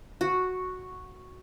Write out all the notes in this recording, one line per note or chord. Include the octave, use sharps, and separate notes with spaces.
F#4